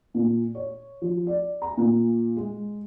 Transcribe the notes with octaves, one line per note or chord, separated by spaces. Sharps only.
A#2
C#5
F3
D5
A#5
A#2
G#3